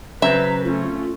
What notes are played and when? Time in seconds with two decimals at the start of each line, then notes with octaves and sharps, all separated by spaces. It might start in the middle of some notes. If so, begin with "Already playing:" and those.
0.22 C#3 F#3 C4 B4 E5 A#5
0.65 A3 C#4 F4